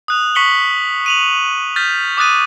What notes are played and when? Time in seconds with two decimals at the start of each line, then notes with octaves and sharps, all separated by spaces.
0.08 D#6 F#6 F7
0.35 C#6 B6 C#7 F#7 G7
1.06 D#7 F7 F#7
1.76 F6 G6 A6 B6
2.17 D6 D#6 F#6 A6 D#7